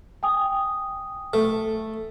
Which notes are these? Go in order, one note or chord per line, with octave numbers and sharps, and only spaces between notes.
G5 G#5 D#6
A3